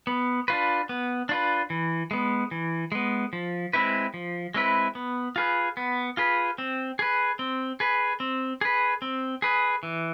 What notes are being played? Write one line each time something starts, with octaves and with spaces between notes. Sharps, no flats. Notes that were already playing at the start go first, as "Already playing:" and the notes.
B3
D4 F4 B4
B3
D4 F4 B4
E3
G#3 B3
E3
G#3 B3
F3
G#3 C4 E4 B4
F3
G#3 C4 E4 B4
B3
F4 G#4 B4
B3
F4 G#4 B4
C4
G#4 B4
C4
G#4 B4
C4
G#4 B4
C4
G#4 B4
E3